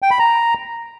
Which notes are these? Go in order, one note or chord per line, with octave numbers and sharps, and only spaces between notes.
G5
B5
A#5